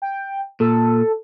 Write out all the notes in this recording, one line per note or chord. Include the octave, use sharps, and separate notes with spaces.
G5
A#2 A4